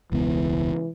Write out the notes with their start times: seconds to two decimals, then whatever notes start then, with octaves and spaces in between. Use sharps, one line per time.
0.12 E1 C#2 E3 B3